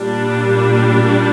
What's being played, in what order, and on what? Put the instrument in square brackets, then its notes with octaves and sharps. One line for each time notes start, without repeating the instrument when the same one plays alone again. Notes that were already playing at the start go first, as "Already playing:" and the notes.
Already playing: [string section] A#2 G3 D4